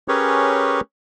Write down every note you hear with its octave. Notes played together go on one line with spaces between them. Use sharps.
C#4 G4 G#4 A#4 B4 C#5